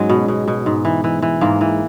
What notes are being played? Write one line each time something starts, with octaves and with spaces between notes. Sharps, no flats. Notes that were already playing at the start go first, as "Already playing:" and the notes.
Already playing: G#2 F#3 G#3 C#4
B2
B2
B2
G#2
E3
E3
E3
G#2 A#3
E3